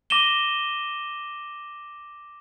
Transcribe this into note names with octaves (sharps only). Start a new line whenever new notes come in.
D6 A#6 D#7 E7 G7